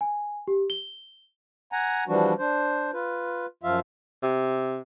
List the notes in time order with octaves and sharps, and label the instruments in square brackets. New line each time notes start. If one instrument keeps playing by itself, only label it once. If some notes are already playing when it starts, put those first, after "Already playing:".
[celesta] G#5
G4
G7
[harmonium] F#5 G#5 A#5
E3 F3 G3 D4 F#4
D4 C5
F4 B4
F#2 F3 F4 E5 F5
[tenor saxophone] C3